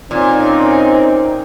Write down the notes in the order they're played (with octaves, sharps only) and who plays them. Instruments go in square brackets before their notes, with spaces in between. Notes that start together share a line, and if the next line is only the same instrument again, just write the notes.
[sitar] A#2 [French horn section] C4 C#4 D#4